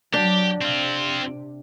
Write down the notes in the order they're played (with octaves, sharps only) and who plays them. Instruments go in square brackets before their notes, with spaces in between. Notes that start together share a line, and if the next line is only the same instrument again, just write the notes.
[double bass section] F#3 [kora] D4 [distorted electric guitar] G4
[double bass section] C3 [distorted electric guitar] C4 F4